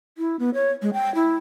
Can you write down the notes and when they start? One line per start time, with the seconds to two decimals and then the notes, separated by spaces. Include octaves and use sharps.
0.18 E4
0.39 B3
0.54 C#5
0.82 G#3
0.93 G5
1.15 E4